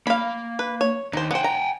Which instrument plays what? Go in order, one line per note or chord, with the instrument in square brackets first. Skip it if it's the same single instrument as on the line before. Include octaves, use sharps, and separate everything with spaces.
[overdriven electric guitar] A#3 [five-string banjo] F5 B5
[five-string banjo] B4
C#5
[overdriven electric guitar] D#2 [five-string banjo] D#4 C5
[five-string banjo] B3 C5 [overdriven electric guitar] F#5 G5
[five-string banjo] A#5